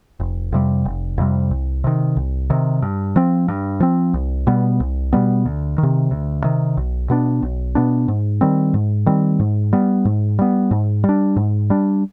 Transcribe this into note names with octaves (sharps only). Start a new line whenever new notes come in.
F1
F2 C3 G3
F1
F2 C3 G3
C2
C3 D#3
C2
C3 D#3
G2
F3 C4
G2
F3 C4
C2
B2 G3 B3
C2
B2 G3 B3
D2
D#3
C3
D2
C3 D#3
B1
B2 B3 D4
B1
B2 B3 D4
G#2
D#3 G3 C4
G#2
D#3 G3 C4
G#2
G3 B3
G#2
G3 B3
G#2
G3
D4
G#2
G3 D4